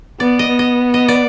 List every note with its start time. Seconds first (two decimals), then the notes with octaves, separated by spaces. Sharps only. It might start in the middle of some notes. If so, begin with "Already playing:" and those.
0.20 B3 D5
0.39 D#5
0.49 B3
0.59 D#5
0.94 D#5
1.08 D5